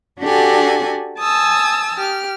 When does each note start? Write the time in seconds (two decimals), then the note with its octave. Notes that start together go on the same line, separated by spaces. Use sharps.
0.21 D4 F#4 G4 A4 F#5 G#5
1.19 G#5 A5 D#6 E6
1.96 G4 F6